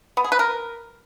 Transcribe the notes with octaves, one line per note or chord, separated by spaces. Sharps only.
B3
G#4
B4
A#4